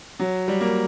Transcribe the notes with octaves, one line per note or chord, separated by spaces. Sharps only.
F#3
G3
A#3